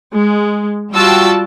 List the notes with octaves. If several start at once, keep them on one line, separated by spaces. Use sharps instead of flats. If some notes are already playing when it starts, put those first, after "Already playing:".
G#3
G3 F4 F#4 G5 A5 E6